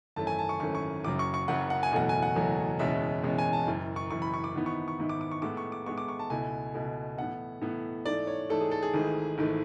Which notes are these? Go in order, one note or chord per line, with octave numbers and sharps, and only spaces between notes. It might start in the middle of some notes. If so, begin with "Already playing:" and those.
G#1 F#2 E3 A3 C#4 A5
G#5
A5
C#6
G#1 F#2 E3 A3 C#4 C#6
C#6
F#1 F#2 C#3 F#3 D6
C#6
C#6
F#1 F#2 C#3 F#3 F#5
F#5
G#5
F#1 E2 B2 F#3 A3 F#5
G#5
F#5
F#1 E2 B2 F#3 A3
F#1 E2 B2 G#3 C#4 E5
F#1 E2 B2 G#3 C#4
G#5
A5
F#1 F#2 E3
C#6
F#1 F#2 E3 C#6
B5
C#6
D6
G#1 G#2 E3 B3 E4
C#6
C#6
G#1 G#2 E3 B3 E4
D6
D6
C#6
A2 G#3 B3 D6
C#6
D6
A2 G#3 B3 C#6
D6
C#6
A5
C#2 B2 A3 E4 G#5
C#2 B2 A3 E4
A2 E3 B3 F#5
A2 E3 B3
G#2 E3 A3 D5
C#5
G#2 E3 A3 A4
G#4
A4
G#4
G#1 G#2 E3 A3
G#1 G#2 E3 A3